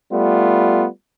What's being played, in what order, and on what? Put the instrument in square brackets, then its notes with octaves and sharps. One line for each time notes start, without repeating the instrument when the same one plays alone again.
[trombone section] G3 A3 B3 F4